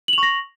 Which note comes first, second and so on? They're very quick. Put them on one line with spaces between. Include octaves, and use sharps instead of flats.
F#7 F7 C#6 A#6